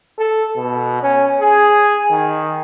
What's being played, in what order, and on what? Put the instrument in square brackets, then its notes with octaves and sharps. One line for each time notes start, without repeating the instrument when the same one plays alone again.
[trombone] A4
B2
C#4
G#4
D#3